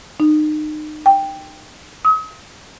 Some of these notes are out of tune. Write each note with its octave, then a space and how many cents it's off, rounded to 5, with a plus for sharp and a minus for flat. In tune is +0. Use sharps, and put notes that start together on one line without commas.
D#4 -30
G5 +5
D#6 +40